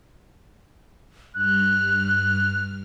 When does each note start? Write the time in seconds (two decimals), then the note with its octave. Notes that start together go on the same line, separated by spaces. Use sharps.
1.35 G2 F6 F#6